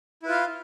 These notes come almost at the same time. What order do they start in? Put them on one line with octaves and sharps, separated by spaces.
E4 B4 F4 F5